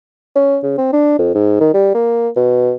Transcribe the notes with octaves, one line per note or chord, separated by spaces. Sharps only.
C#4
C#3
C4
D4
F2
G#2
D#3
G3
A#3
B2